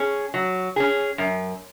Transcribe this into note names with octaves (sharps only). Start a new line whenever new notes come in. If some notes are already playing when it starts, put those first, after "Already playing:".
Already playing: C#4 G#4
F#3
C#4 G#4
F#2